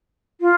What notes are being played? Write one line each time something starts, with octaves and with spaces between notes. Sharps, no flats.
F4